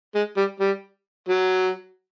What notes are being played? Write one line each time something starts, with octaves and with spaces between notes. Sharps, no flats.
G#3
G3
G3
F#3